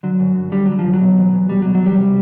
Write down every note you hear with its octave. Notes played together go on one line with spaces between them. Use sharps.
D3 F#3
F#2
F#2
D3 G3
D3 F#3
F3
F#2
F#3
B2
E2
E2
B2 G3
B2 F#3
F#3
E2 G3
C3